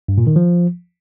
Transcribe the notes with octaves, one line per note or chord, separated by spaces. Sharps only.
G2
A#2
D#3
F3